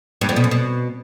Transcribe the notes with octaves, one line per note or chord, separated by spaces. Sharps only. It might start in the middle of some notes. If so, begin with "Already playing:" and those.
G2
F2
B2
F#2
B2